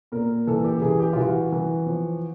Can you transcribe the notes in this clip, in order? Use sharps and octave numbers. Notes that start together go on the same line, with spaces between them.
A#2 A#4
E3 A4
G4
E3 G#4
G4
F4
E3 F#4
E3
F3